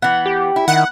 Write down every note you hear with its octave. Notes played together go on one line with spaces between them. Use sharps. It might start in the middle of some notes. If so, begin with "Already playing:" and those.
E3 B3 F#5
G4
E4
D#3 F#5